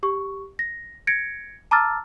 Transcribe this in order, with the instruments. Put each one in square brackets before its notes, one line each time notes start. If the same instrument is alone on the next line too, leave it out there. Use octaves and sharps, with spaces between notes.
[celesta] G4 C#6
A#6
G#6 A#6 C#7 D7
A5 A#5 D6 E6 F6 A6